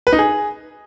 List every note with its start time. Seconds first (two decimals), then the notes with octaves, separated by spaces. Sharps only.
0.07 B4
0.13 D#4
0.19 G#4